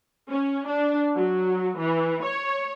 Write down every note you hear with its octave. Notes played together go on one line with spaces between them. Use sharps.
C#4
D4
F#3
E3
C#5